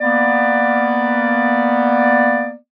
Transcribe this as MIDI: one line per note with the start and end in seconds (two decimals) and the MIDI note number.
0.01 2.54 58
0.01 2.54 59
0.01 2.54 74